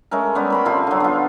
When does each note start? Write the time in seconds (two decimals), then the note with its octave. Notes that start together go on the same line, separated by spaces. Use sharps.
0.11 G#3 A3 C#4 A#4
0.35 G3 B3 C#4
0.50 A#4 B5 C6
0.65 C3 F3 A4 C6
0.87 D3 F#3
1.00 B3 F4